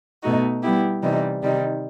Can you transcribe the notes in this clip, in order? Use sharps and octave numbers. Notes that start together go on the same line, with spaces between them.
B2 A3 D#4 F#4
G3 B3 E4 G4
C3 E3 G3 D#4
C3 D#3 G3 D#4